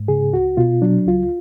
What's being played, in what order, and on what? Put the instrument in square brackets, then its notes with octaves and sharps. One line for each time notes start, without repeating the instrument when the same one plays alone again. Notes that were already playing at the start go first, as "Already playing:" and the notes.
Already playing: [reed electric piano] G#2
C#3 G#4
C#2 F#4
B2 F4
F#3 D4
C#2 F4